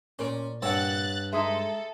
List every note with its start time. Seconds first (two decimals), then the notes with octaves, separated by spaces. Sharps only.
0.19 A#2 C#4 A#4 D5
0.62 G2 C4 C#5 F#5 A5 F#6 A6
1.33 G#3 D#4 G#4 A4 E5